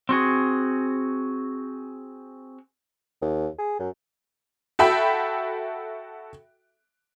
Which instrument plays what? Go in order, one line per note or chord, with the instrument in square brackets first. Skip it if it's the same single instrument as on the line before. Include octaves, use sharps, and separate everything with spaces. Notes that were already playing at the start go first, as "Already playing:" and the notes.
[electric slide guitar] C4 F#4 G#4
[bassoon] D#2
G#4
F#2
[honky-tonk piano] F#4 A4 E5 G5 B5